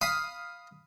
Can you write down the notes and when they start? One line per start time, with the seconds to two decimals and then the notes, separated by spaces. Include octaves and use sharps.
0.01 F5 B5 D#6